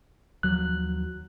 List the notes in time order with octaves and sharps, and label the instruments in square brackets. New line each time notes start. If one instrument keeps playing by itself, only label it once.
[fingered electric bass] D#2 F3 F#3 [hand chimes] F#6